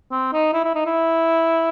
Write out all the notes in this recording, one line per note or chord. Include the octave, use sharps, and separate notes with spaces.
C4
D#4
E4
E4
D#4
E4